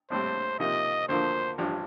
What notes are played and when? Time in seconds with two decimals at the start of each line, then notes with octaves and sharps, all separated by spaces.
0.10 A#1 A2 G3 C4 C5
0.59 C3 F3 A#3 D#4 D#5
1.09 D2 D3 F3 A#3 C5
1.58 A1 G2 F3